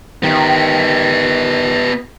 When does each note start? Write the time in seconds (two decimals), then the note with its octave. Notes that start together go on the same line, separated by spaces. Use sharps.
0.23 D#3 B3 G4